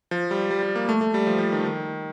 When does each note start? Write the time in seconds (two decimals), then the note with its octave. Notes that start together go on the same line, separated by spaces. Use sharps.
0.11 F3
0.31 G3
0.50 G3
0.63 G3
0.75 A#3
0.89 A3
1.01 A3
1.14 G3
1.27 F3
1.38 F3
1.52 D#3
1.65 D#3